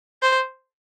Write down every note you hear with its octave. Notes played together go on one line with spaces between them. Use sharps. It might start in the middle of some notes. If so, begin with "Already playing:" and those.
C5